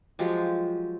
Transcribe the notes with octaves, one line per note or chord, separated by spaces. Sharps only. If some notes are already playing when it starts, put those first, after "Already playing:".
F3 F#3 G#3 G4